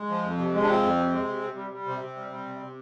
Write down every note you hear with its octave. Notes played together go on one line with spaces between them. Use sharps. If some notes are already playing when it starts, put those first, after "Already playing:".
Already playing: G#3
F3
F2
C3
G#3
D4
F3 C4
F2
C3
G#3
C3
C3
G3
G3
C3 C4
C3
G3
G3
C3
C3